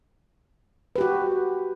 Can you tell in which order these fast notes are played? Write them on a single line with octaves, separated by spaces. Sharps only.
B4 G4 F#4